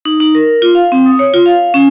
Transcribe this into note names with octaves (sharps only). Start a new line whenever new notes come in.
D#4
D#4
A#4
F4
F5
C4
D#6
C#5
F4
F5
C#4